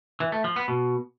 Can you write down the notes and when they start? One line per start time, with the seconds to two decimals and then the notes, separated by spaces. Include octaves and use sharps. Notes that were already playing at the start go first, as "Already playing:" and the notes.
0.20 E3
0.32 A3
0.44 F3
0.56 B3
0.68 B2